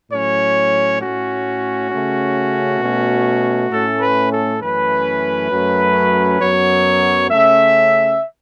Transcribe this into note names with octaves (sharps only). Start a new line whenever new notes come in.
A2 F#3 C#4 C#5
A2 A3 C#4 F#4
C#3 A3 C#4
B2 A3 C#4
A2 A3 C#4 A4
B4
A4
F#2 E3 A3 C#4 B4
F#2 F#3 A3 C#4
F#2 F#3 B3 C#5
C#3 A3 C#4 E5